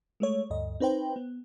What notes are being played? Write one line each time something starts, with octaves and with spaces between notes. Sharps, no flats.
G#3 A3 C#5
D2 G2 D#5
C4 D#4 B4 C5 G5
B3